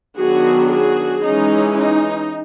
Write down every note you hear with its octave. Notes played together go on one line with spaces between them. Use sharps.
D#3 F#3 B3 D4 F#4 G#4
F#4 G#4
E3 G#3 C#4 D#4
D#4